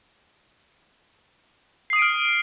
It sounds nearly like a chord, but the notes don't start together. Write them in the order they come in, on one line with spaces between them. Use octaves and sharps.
C7 D#6 D#7 D7 F6